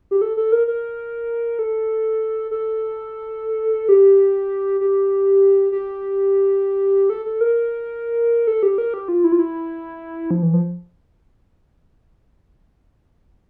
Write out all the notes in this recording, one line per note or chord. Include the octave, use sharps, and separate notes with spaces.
G4
A4
A4
A#4
A#4
A4
A4
G4
G4
G4
A4
A4
A#4
A4
G4
A#4
G4
F4
E4
F4
E4
F3
E3
F3